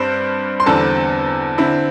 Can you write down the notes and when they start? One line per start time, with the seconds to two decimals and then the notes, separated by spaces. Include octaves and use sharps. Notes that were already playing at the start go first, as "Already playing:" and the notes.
Already playing: G2 G3 C4 C5
0.60 C6
0.66 E2 D3 G3 C4 A4 A5
1.58 D3 C4 E4